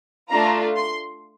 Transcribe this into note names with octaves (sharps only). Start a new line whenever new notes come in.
A3 D4 F4 A#5
C6